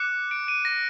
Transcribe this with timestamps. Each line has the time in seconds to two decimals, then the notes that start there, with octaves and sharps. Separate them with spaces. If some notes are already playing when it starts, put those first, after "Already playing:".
Already playing: D6 F#6 C#7
0.31 D7
0.48 D#7
0.65 A#6